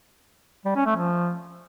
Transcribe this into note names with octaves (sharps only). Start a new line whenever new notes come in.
G3
C#4
A3
F3